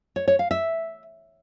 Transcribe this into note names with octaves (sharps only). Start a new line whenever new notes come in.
C#5
C#5
F5
E5